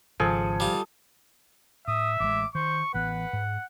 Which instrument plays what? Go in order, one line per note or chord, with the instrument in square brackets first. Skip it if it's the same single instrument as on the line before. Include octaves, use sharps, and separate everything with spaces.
[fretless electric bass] G#1 C#3 [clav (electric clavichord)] F3 [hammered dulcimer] G#4 A4
[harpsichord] G3 F4
[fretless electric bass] A2 [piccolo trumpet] E5 [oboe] D#6
[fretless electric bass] A1 G#3 [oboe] D6
[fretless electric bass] D#3 [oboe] C5 [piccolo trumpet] C#6
[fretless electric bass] A1 E3 B3 [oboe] B4 [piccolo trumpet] F#5
[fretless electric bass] G#2